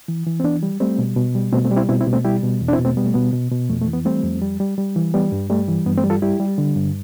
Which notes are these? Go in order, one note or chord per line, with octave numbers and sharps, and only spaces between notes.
E3
E3
C4
E3 B3 D4
G3
G3 A3 C4
B2
B2
G3
B2 A3 C4
A3 C4
G3
C4 E4
B2 C4 E4
C4 E4
B2
A3 C4
G3 E4 G4
B2
E2
D4
C4 E4
B2
A3 C4
G3 B3
A3
B2 B3
B2
B2
F2 A3
A3
E3
B3
G3 A3 C4
F2
G3
G3
G3
E3
G3 B3
G2
G3 A3
E3
G2 B3
A3 C4
G3
F4 A4
G3 E4 G4
G3
D3
G2